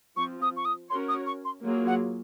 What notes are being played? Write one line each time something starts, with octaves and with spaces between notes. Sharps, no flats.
F3 C4 F4 C#6
D#6
C#6
D#6
C#4 F#4 A#4 C#5 C6
D#6
C#6
C6
F#3 A#3 F4 G#4
F#5